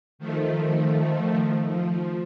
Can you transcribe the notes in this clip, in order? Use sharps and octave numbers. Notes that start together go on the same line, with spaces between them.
D#3 F3 A3
F3